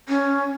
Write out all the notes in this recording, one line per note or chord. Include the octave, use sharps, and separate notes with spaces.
C#4